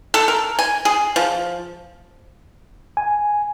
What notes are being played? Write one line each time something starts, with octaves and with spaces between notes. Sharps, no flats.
A4
A#4
G#5
G#4
F3
G#5